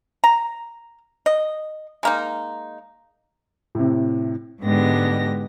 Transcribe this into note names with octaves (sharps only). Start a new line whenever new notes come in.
A#5
D#5
G#3 A#3 D#4
A2 C3
G#2 D3 G#3 B3 G4 A#6